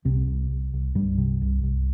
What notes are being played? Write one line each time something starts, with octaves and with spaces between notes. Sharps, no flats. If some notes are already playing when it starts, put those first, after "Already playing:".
C2 C3 C4
C2
C2
C2
C2 G2 G3
C3
C2
C2